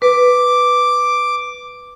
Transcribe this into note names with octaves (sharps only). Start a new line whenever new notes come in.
B4 D6